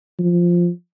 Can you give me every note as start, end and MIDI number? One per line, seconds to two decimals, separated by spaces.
0.19 0.69 53